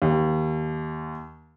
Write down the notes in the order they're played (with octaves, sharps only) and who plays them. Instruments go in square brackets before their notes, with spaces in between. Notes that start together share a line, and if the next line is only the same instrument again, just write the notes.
[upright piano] D#2